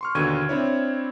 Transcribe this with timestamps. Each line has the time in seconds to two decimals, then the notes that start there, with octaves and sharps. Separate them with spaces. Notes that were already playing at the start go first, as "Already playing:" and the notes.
0.01 C6 C#6 F6
0.15 D#2 B2 D3 C#6 G#6 D#7
0.49 C4 D4 E4 C#5